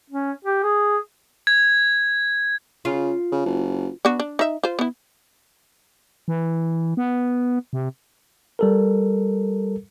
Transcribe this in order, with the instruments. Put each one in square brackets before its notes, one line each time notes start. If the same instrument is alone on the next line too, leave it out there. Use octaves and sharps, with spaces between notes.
[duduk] C#4
G4
G#4
[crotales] G#6
[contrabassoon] C#3 [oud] F4
[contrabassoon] C#3
F#1
[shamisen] B3 D4 F#4
D4
D#4 E5
F4 C5
B3 E4
[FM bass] E3
B3
C3
[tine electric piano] G3 A4 A#4